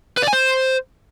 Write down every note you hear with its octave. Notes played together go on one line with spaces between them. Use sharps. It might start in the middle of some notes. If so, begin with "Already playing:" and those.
B4
D5
G#5
C5